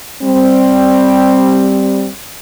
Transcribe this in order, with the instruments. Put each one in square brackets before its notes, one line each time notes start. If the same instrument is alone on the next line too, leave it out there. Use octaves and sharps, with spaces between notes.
[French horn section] G3 C4